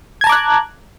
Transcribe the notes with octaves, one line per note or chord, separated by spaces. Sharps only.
A5 A#5 D6 F#6 G#6